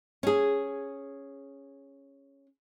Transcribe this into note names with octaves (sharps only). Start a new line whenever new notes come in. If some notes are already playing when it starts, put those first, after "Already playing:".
C#4 G#4